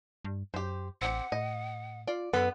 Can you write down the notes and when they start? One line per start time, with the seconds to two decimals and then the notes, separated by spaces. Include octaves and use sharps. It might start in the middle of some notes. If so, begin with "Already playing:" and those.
0.25 G2
0.54 F#2 G4 C5
1.02 A1 C4 G4 F#5
1.32 A2 D#5
2.07 F4 D5
2.33 F#2 B3 A4